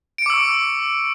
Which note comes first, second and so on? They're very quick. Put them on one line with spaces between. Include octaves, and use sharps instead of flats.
D7 C#7 D6 E6 C#6